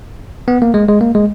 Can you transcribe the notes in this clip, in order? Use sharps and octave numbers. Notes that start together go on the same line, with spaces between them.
B3
A#3
G#3
G#3
A#3
G#3